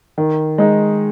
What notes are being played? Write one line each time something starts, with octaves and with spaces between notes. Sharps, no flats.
D#3
G#3 D#4